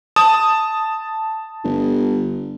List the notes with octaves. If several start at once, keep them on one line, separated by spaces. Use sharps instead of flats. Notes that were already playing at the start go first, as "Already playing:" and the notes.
A5 D#6
G1